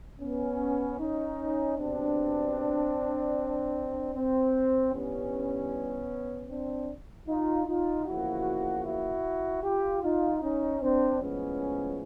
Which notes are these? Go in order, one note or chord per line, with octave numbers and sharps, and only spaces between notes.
B3 C#4
C#4 D#4
B2 G3 B3 C4 D4
C4
G2 E3 G3 B3 C#4
C4 D4
D#4 F4
D#4 F4
E2 C#3 F3 A#3 E4 F#4
E4 F#4
F4 G4
D#4 F4
C#4 D#4
C4 D4
A2 F3 G#3 B3 C#4